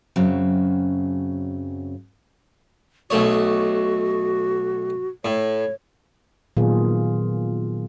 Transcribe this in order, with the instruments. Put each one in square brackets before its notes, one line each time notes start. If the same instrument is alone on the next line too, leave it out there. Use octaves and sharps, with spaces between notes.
[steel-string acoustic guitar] F#2 C#3 F#3 C4
[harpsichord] B1 A3 C#5 [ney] F#4
[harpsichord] A2 [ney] C#5
[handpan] A#2 D#3 F#3 B3 F4 G#4